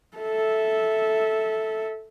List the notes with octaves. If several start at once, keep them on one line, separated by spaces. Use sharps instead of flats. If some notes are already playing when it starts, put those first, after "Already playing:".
A4 E5